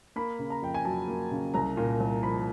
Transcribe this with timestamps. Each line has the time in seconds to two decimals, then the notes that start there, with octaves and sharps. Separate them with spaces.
0.16 A#3 B5
0.39 C#3
0.50 A#5
0.62 F2 G5
0.74 G#5
0.85 F#3 A5
1.08 A#3
1.31 C#3
1.54 C2 A#5
1.77 A#2
2.00 C2
2.23 F3 B5